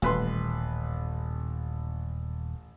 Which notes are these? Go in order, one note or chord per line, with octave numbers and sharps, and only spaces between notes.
D#1 A1 B4 C6